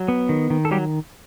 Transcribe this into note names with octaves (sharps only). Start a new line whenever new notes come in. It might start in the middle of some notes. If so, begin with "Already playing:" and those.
Already playing: F#3
B3
D#3
D#3
A4
F#3 G3 G4